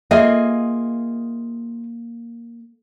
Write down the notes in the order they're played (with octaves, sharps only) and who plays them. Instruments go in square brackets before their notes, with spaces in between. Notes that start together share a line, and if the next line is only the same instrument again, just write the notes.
[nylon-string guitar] A#3 [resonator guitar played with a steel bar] F4 G#4 D#5 [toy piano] E5